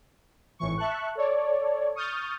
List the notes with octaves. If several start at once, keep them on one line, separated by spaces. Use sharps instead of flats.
G#1 A2 E3 C#6
E5 A5 C#6 F#6
A4 C#5 D5
C#6 D#6 F6 G6 A6